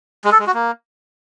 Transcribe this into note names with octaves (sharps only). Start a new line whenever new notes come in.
G#3
A4
G#3
F#4
A#3